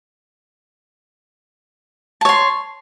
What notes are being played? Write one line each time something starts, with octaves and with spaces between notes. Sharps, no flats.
C#5 A5 C6